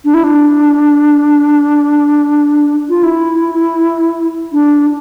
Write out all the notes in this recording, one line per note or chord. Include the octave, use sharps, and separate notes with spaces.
D4
E4
D4
F4
E4
D4